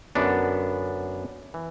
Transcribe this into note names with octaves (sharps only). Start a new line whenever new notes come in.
F#2 D3 B3 D4
E3